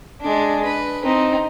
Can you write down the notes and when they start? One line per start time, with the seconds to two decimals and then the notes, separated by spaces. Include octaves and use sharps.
0.21 G#3 D4
0.66 B4
1.03 C4 D#4